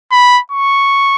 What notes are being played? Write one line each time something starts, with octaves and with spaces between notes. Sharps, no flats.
B5
C#6